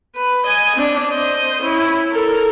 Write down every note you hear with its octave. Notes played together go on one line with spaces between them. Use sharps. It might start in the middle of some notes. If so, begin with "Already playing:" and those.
B4
D#5 G#5
C4 D4
C5 D#5
C#4 E4
A4 A#4